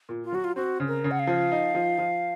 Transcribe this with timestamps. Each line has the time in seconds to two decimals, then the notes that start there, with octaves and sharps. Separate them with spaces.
0.09 A#2
0.24 F4
0.32 F#3 F#4
0.44 F4
0.56 C4 F#4
0.80 C#3
0.88 A#4
1.04 C#3
1.11 F#5
1.19 F5
1.27 F3
1.52 D#4
1.75 F3
1.98 F3